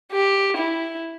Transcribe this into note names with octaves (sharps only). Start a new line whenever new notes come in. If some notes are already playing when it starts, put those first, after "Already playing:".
G4
E4